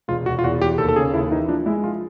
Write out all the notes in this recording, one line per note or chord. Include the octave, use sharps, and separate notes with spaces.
E1 F4
E1 F#4
F4
E2 F#4
E1 G4
D#2 A4
A4
C#3 G#4
D#2 E4
E3 D#4
F3 D4
G#3 E4
F3 F4